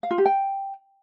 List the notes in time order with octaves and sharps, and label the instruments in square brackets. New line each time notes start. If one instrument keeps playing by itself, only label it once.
[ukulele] F5
F4
G4
G5